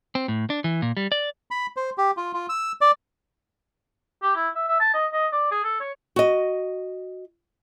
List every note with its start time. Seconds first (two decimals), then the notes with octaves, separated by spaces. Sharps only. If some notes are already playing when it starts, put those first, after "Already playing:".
0.15 C4
0.28 A2
0.50 D4
0.64 E3
0.82 A#2
0.97 G3
1.12 D5
1.51 B5
1.76 C5
1.98 G4
2.17 F4
2.33 F4
2.49 E6
2.81 D5
4.23 G4
4.36 E4
4.55 E5
4.68 E5
4.80 A5
4.94 D#5
5.13 D#5
5.32 D5
5.51 G#4
5.64 A4
5.80 C#5
6.16 F#4 D#5